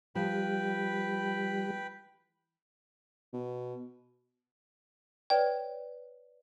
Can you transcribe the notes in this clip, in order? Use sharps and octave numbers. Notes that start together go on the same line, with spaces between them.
F3 G3 B4 G5 B5
B2
B4 C#5 D5 G5